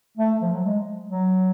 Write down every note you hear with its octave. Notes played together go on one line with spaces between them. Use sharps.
A3
F3
F#3
G#3
F#3